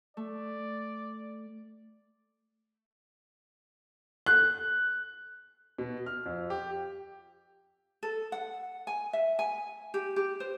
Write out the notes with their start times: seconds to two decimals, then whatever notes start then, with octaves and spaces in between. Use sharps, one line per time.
0.17 A3 D5
4.26 F#6
5.78 B2
6.06 F6
6.26 F2
6.50 G4
8.03 A4
8.32 F#5
8.87 G#5
9.13 E5
9.39 G#5
9.94 G4
10.16 G4
10.40 C5